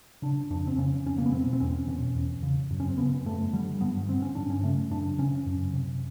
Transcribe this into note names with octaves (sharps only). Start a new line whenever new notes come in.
C#3 D4
F2 D4
C4
C#3 C#4
F2 C#4
A#3
B3
B2 C4
C4
E2 C#4
B2 C#4
E2
C#3
F#2
C#4
C4
C#3 B3
F#2 A3
D3 G3
G2 B3
D3 C4
C#4
G2 D4
C#4
C#3 A3
F#2 D4
C#3 C#4
F#2
C3